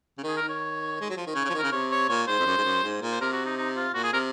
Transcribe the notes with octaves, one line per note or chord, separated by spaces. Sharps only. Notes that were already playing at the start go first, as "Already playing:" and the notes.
C#3
D#3
G#4
A#4
D#3
C#5
G#3
F#3
F3
D#3
C#3 C#5
C#3 F3 C#5
D#3
A#4
C#3
C3 C#5
C#5
A#2 C#5
G#2 C5
F2
F#2
G#2
F#2
G#2
A#2
C5
C3 A#4
F#4
D#4
D#4
F4
A#2 F#4
G#4
C3 A#4